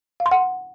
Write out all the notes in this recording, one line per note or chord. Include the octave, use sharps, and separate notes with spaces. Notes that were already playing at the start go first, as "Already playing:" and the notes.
F5
C6
F#5